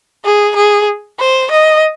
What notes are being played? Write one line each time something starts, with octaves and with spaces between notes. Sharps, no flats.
G#4
G#4
C5
D#5